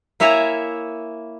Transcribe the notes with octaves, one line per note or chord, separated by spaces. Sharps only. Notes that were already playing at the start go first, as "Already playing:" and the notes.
A#3 E4 C#5 E5 G#5 A#5